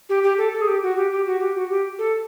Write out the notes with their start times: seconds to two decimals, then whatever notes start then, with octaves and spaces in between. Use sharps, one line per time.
0.09 G4
0.23 G4
0.38 A4
0.53 A4
0.61 G#4
0.67 G4
0.82 F#4
0.97 G4
1.12 G4
1.26 F#4
1.40 G4
1.55 F#4
1.70 G4
1.99 A4